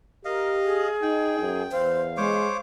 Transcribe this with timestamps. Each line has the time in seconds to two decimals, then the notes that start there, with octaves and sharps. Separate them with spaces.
0.25 G4 A#4 D#5 F5
0.64 G#4
1.02 D#4 G5
1.39 F#2
1.72 E2 C5 F5
2.17 G#3 C5 C#5 D6